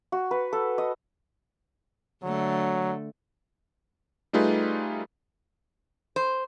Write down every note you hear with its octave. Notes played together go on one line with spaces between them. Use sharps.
F#4
B4
A4
D#5
D3 F#3 A3
G3 A3 D#4 F4 G#4 B4
C5